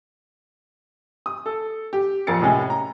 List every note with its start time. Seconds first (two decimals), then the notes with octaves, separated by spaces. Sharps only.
1.26 D#6
1.46 A4
1.93 G4
2.27 A#1 F2 A#4 A6 C#7
2.41 A2 C3 G#3 C#4
2.70 A#5